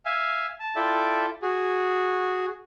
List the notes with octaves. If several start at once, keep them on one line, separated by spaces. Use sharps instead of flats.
E5 F5 G#5
A5
E4 F4 A4 D5 E5 G5
F#4 G#4